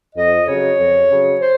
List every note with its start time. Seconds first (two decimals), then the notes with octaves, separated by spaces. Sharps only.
0.15 F2 D#5
0.47 C#3 F#3 C#5
0.78 F2
1.10 C#3 F#3
1.41 C5